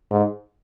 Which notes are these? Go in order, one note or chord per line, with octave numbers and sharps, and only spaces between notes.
G#2